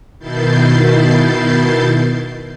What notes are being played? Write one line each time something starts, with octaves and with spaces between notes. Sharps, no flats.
B2 D#3 E4 G6 A6 C7